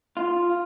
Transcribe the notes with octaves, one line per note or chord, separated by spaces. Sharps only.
F4